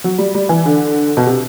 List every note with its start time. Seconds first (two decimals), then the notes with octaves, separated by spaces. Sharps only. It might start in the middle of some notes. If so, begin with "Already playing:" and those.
0.04 F#3
0.18 G3
0.35 G3
0.49 E3
0.66 D3
1.17 B2
1.26 C3